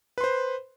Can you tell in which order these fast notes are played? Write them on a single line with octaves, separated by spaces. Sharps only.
B4 C6 C5